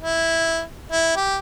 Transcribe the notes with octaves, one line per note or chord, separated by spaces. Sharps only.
E4
E4
G4